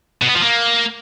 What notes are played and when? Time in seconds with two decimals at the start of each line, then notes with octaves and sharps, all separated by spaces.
0.22 B2
0.28 B3
0.35 F3
0.42 A#3